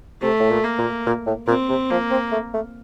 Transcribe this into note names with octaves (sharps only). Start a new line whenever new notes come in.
C3 A3
A2
A#2
A#3
A#2
A#2
A2
A#2 C4
C3
F3 A#3
C4
A3
A3